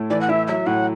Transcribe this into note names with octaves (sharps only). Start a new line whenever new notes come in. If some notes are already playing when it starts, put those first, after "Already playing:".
Already playing: A2 A3 E4
E3 D5
F#5
E4 E5
F#3 E5
A2 F#5